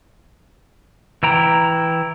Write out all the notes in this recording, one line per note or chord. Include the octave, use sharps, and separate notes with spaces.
E3 E4 G5 A#5